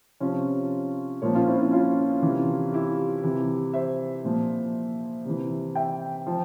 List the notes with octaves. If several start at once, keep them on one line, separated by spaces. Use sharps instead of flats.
C3 F3 C#4 F4
A#2 F3 A#4 C#5
C#4 F4
C4 E4
C4 E4
C#4 F4
C3 E3
E4 G4
C3 E3
C5 E5
A#2 F3
C3 E3
E5 G5
F3